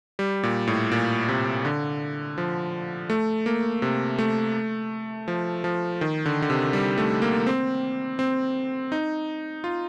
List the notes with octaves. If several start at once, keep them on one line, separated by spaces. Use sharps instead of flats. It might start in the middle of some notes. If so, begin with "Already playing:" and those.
G3
A#2
A2
A#2
C3
D3
F3
A3
A#3
C3
A3
F3
F3
D#3
D3
D3
C3
G3
A3
A#3
C4
C4
D#4
F4